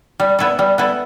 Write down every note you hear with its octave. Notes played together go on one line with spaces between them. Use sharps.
G3
B3 E4 A4
G3
B3 E4 A4